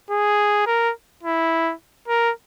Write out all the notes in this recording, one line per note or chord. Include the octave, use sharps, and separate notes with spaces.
G#4
A#4
E4
A#4